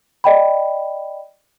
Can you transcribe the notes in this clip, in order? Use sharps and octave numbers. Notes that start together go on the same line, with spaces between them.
D5 D#5 G5 B5